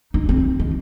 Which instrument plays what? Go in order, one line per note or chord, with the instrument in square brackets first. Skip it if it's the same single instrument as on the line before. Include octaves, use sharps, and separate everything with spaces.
[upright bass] D#4
C4
D#3